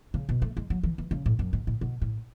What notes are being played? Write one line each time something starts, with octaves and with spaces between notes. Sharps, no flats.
C#3
B2
A3
G#3
F#3
E3
E3
C#3
A2
F#2
G#2
A2
B2
A2